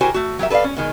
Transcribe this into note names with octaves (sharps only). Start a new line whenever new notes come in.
E4 F#4 G4 A#4 C5 G#5
A3 F#4
F#3 G4 A#4 E5
A4 B4 C#5 D5 F5
C#4
B2 D#3 G#3